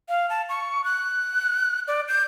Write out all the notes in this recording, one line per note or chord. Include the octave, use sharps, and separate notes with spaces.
F5
A5
C#6
F#6
D5
G6